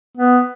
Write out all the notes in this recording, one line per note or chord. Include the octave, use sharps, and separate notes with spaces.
B3